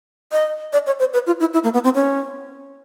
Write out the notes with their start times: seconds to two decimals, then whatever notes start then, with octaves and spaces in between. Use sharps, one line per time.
0.32 D#5
0.73 D5
0.87 C#5
0.99 C5
1.13 B4
1.26 F4
1.40 E4
1.54 E4
1.64 A#3
1.74 B3
1.84 C4
1.95 C#4